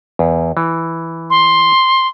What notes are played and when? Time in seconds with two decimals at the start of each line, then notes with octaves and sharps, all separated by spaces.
0.19 E2
0.57 E3
1.30 C6